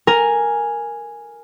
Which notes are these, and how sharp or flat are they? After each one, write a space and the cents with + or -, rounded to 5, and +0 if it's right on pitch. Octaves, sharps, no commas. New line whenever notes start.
A#4 +0 G#5 +0